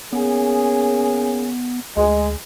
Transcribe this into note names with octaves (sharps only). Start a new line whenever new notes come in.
A#3 B3 C#4 G#4
D2 G#3